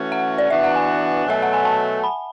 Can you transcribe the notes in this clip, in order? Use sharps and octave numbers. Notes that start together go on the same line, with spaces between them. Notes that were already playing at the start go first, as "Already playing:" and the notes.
Already playing: E3 A3 C#4 F#4
F#5
D5
E3 B3 D4 F#4 E5
F#5
G#5
B2 F#3 A3 E5
F#5
G#5
A5
B5